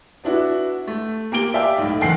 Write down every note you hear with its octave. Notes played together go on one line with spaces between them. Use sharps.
B3 D4 E4 F#4
A3
A#3 G4 D7 G7
D5 E5 F5 G5
B1 A2
F#1 E2 F#5 G5 C7